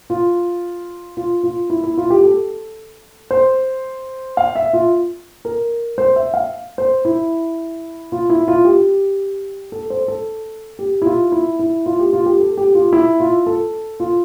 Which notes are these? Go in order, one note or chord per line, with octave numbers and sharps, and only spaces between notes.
F4
F4
F4
E4
E4
F4
G4
A4
C5
F5
E5
F4
A#4
C5
E5
F5
C5
E4
F4
E4
F4
G4
A4
C5
A4
G4
E4
F4
E4
E4
F4
G4
F4
G4
A4
G4
F4
E4
F4
A4
F4